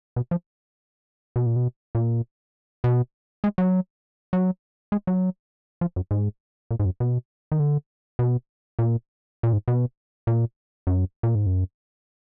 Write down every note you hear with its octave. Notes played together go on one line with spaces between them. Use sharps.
B2
F3
B2
A#2
B2
A#2
B2
G#3
F#3
F#3
G#3
F#3
F3
F#2
G#2
A#2
G#2
F#2
B2
D#3
D3
B2
A#2
A#2
G#2
B2
A#2
F#2
A#2
G#2
F#2